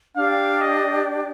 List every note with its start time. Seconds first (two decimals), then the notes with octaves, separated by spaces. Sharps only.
0.17 D4 G4 D5 F5 G5
0.61 D#5